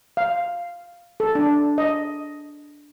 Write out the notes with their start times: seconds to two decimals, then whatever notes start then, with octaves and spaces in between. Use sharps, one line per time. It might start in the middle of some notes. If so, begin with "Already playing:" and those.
0.17 F5
1.20 A4
1.35 D4
1.78 D#5